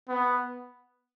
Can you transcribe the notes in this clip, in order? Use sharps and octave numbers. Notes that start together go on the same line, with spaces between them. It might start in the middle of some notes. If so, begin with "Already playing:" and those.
B3